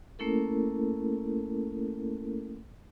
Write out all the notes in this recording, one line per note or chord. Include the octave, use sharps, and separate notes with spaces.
A3 A#3 C#4 E4 A4 A#4